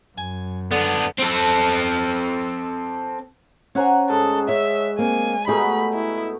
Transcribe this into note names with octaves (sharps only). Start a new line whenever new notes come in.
F#2 G#5
D3 B3 D4
C4 A4
C#4 C5 C#5 F#5 G#5 A#5
G#2 G#4 A4
C#5 E5
A#3 C4 G#5
B2 A3 D#4 G4 G#4 B5
E4